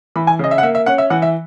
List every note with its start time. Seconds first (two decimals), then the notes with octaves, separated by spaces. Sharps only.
0.16 E3 B5
0.27 G#5
0.39 C#3 D#5
0.51 E5
0.58 F#5
0.63 A#3 E5
0.75 E5
0.86 C#4 F#5
0.98 E5
1.10 E3 F#5
1.22 E5